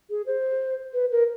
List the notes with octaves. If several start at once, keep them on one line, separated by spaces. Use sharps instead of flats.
G#4
C5
B4
A#4